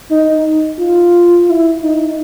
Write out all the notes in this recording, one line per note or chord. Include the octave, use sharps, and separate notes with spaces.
D#4
F4
E4
D#4